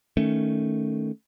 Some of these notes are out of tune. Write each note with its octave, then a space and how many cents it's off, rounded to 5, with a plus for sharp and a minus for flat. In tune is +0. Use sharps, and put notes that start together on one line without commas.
D#3 +0 A3 +0 C#4 +0